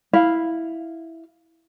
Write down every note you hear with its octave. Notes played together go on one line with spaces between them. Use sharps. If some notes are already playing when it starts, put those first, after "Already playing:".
E4 F5